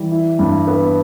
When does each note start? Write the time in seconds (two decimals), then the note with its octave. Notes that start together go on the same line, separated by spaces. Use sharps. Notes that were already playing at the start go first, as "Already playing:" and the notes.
Already playing: E3 G3
0.12 E4
0.39 G2
0.67 B3